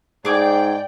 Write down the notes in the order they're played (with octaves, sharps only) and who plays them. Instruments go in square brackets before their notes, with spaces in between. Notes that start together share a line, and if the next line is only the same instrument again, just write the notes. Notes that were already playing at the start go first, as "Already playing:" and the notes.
[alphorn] G#2 [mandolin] G#4 D6 [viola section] D5 G5